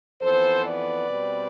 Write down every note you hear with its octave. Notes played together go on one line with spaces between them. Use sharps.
F2 E3 B3 A4 C5
B4 D5
B2 G3 C4